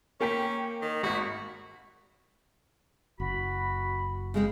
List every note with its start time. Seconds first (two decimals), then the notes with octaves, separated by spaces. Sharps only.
0.20 A#3 C#4 G5 B6
0.82 D#3
1.03 G#1 F#4 B6
3.20 F#1 F#4 B5
4.34 C#3 G#3 C4